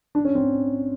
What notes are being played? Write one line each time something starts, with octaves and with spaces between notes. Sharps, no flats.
D4
C#4
C4